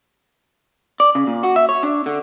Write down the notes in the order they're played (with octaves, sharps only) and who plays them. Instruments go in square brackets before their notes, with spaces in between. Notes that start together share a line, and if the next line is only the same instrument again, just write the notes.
[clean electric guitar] D5
C#3
A#2
F#4
E5
C#5
D4
D3